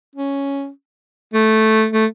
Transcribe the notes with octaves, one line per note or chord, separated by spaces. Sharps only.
C#4
A3
A3